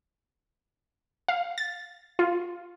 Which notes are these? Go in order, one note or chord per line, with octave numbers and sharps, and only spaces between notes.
F5
A6
F4